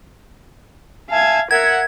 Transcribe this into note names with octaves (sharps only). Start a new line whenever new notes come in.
E5 F5 G#5 A5 G#6
A#4 E5 F#5 G#6